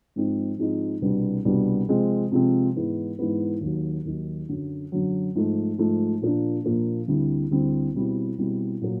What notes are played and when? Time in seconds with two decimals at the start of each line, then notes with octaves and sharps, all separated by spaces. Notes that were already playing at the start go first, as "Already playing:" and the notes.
0.16 G#2 F3 G#3 C4 D#4
0.58 G#2 F3 G#3 C4 D#4
1.01 C2 B2 G3 B3 D4
1.45 C2 B2 G3 B3 D4
1.88 C3 F3 G#3 C4
2.32 C3 F3 G#3 C4
2.75 G#2 E3 G#3 B3 E4
3.18 G#2 E3 G#3 B3 E4
3.61 D#2 D#3 F#3
4.05 D#2 D#3 F#3
4.49 F#2 D3 F#3
4.92 F#2 D3 F#3
5.35 G#2 F3 A3
5.78 G#2 F3 A3
6.22 A#2 F3 A#3 D4
6.64 A#2 F3 A#3 D4
7.08 D2 D3 G3 C4 E4
7.51 D2 D3 G3 C4 E4
7.94 B2 G3 C4 E4
8.38 B2 G3 C4 E4
8.81 A#2 F#3 A#3